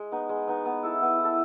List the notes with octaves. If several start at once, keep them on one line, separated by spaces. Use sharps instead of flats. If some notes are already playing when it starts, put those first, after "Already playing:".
Already playing: G#3
B3 D#4
G#3
B3 D#4
B3
E4 A4
B3
E4
A4